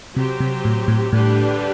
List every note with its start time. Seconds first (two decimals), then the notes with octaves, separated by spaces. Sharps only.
0.16 C3 F#3 C4 G4
0.40 C3
0.65 A2
0.88 A2
1.12 A2 D3 G3 D4 G4 B4